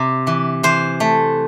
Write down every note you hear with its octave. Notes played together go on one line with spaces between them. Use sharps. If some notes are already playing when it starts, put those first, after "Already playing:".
Already playing: C3
E3
E3 C5
A3